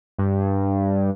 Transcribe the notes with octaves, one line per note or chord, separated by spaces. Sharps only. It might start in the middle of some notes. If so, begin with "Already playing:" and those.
G2